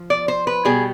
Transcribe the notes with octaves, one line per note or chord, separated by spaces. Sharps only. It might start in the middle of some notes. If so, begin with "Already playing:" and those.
Already playing: F3
D5
C5
B4
B2 G3 G#4